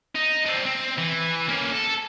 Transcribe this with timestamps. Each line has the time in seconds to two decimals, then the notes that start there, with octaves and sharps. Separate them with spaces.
0.15 D#4
0.46 C4 D4
0.65 C4
0.98 E3
1.48 A#3 C#4
1.72 A4